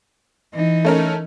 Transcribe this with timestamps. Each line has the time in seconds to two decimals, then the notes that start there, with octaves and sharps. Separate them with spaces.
0.54 E3 D#4
0.85 A3 C#4 A#4